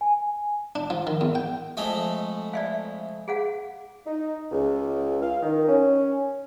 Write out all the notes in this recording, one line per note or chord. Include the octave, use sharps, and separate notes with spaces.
G#5
D4
F3
D#3
E2
G5
F2 G#3 A3
D5 E5 F5
G#4 F5 F#5
D#4
C#2
F5
D#3
C#4